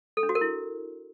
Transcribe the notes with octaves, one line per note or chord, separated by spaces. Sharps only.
A4
D4
F#4
A#4
E4